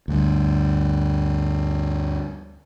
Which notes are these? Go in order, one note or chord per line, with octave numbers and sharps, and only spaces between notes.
D2 G2